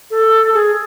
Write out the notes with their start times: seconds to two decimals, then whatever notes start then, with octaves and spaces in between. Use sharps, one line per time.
0.11 A4
0.54 G#4